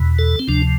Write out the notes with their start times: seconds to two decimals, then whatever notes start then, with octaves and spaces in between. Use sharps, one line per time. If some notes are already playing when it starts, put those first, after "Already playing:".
Already playing: E2 B2
0.19 A4
0.39 C4
0.48 D2 C3 F3 D4